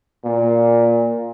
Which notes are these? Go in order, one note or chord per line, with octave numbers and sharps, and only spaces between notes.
A#2